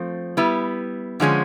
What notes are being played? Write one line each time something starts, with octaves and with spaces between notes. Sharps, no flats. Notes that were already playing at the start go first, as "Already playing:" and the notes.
Already playing: F3 A3 C4
G3 B3 E4
D3 F3 G#3 C#4